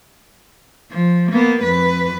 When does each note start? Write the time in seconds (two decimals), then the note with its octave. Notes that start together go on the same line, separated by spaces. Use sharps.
0.91 F3
1.32 A#3 B3
1.62 F2 B4